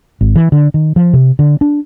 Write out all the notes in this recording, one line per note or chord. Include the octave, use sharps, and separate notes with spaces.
G#1
E3
D3
D#3
F3
C3
D3
D4